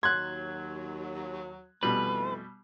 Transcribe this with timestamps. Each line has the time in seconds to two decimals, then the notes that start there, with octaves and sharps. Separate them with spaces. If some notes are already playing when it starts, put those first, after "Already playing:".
0.03 D#2 F#3 C6 F#6 G#6
1.83 F2 B2 E3 G3 A3 B4